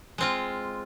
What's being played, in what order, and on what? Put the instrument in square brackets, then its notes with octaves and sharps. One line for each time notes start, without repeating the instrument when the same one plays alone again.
[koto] G#3 C4 F4